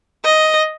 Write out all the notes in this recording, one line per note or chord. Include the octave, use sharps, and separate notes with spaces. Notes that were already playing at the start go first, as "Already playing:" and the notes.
D#5